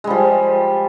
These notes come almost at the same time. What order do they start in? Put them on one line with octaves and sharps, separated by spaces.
G#3 G3 F3